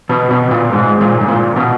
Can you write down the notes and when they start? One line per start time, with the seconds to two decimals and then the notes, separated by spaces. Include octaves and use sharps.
0.09 B2
0.31 B2
0.51 A#2
0.73 G#2
1.01 A#2
1.21 G#2
1.28 A#2
1.56 B2